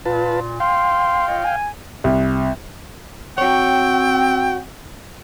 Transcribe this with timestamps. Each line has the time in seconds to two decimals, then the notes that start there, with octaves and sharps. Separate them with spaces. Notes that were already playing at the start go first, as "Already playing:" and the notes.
0.05 A#2 F4 B4 A5
0.60 F5 G5 C6
1.27 F4 C#5 D#5
1.44 G#5
2.04 C2
3.38 C4 F#4 C#5 G5